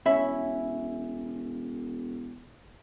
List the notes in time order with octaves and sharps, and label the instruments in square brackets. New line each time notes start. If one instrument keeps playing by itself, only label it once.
[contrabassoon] E1 [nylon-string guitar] C#4 [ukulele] E4 E5 B5